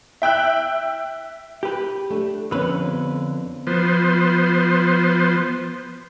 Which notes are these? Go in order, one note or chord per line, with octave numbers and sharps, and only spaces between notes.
E5 G5 E6 F#6
G4 B4
A3 D4
F2 D3 B3 C#4 B4
F3 B3 C5